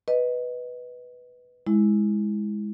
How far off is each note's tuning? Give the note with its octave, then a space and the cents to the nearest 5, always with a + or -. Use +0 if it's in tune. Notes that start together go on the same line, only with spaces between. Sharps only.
B4 +0 D#5 +0
G#3 +0 E4 -5